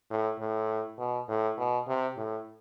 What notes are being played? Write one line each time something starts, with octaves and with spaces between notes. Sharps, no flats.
A2
A2
B2
A2
B2
C3
A2